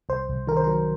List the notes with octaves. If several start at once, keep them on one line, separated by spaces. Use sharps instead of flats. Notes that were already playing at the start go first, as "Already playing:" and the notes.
C2 C5
C2
D#3 A#4
C5
A#4
F#3